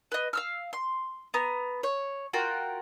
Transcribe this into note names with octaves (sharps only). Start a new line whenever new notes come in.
B4 D#5
F5 E6 F6
C6
B3 A#5
C#5
F4 F#4 A#4 G5